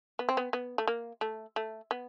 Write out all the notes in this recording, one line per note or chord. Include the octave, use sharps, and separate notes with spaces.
B3
C4
B3
B3
A3
A#3
A3
A3
B3